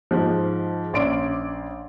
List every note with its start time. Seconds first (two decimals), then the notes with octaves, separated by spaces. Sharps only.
0.11 G#2 F3
0.93 A#1 C#4 D5 C6 D7